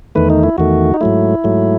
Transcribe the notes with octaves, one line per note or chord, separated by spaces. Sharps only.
E2 D#3 A3 B4
D#4
E4
E2 D#3 A3 F#4
D#4
G#2 F#3 A3 E4
G#2 F#3 A3